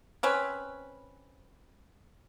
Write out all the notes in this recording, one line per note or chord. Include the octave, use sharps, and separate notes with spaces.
C4 C#4 B4